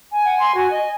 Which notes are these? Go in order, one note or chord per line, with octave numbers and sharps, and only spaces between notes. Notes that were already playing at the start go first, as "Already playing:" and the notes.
G#5
F#5
C6
F#4
D#5